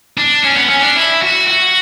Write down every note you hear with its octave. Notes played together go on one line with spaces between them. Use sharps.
D4
C#4
B3
C#4
D4
E4
F#4
F#4